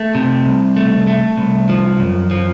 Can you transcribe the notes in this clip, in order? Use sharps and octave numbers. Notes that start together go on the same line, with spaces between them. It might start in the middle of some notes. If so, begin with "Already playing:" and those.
Already playing: A3
C3
C2
A3
A3
C2
F3
F#2
F3